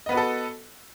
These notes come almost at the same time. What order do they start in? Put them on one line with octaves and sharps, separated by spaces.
D#5 B3 B4 F#4 A4